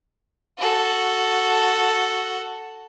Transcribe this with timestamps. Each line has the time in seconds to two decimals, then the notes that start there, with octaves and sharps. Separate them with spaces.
0.59 F#4 A4